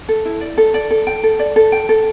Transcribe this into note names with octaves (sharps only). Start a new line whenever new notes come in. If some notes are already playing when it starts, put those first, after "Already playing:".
A4
E4
D5
A4
D5
A4
G5
A4
D5
A4
G5
A4